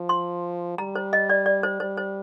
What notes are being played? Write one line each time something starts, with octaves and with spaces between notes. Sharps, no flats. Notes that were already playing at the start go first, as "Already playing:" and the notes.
Already playing: F3
C6
G3 A#5
C5
D#5
D5
D5
C5
G3 C5
C5